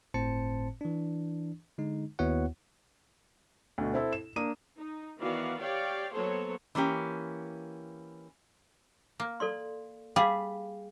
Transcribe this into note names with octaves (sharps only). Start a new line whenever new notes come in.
G1 A2 C4 C5 A5 C#7
E3 D4
D3 G#3 D#4
D#2 B3 E4 F#4 C#5 F#5
D2 B2
C4 E4 A4
E7
A#3 D4 D#6 D#7
D#4
D#3 E3 B3 F#4 D5 F5
G4 C#5 D5 F5 G5
F#3 A#3 B3 A4 C5 C#5
E3 A#3 C#4 G4
A#3
A4 D5 C6
G3 G#4 F5